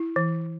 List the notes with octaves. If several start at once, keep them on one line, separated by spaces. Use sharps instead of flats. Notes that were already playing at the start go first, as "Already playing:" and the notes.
Already playing: E4
E3